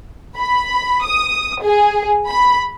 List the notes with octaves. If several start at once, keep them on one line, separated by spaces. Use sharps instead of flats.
B5
D#6
G#4
B5